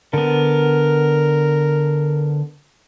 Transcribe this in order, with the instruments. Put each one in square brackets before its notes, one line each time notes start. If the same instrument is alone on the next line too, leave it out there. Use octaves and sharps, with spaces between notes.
[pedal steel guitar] D3 B3 [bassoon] A#4